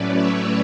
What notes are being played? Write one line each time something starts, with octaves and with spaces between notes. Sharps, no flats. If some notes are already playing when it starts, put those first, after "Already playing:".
Already playing: A2 F#3 A3 C#4 B4 D5
C#5 E5